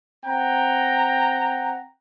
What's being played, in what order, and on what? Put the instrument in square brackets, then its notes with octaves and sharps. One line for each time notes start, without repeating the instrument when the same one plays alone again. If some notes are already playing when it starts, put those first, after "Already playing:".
[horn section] C4 F#5 G5 A#5